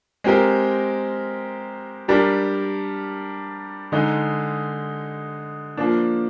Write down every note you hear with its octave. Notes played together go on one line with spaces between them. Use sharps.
G#3 C4 G4 A#4
G3 D4 G4 A#4
D3 G#3 D#4
F3 A#3 D4